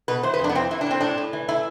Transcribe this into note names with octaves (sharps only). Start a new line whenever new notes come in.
B2 B4
E3 C5
B4
F2
D4
B3
E3 C4
E3 E4
D4
A2 C4
A2 D4
A2
E3
A3 E4